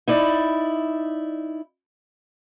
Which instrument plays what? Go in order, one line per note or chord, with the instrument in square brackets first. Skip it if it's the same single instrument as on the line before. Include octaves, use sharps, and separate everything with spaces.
[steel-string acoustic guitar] D#4 E4 D5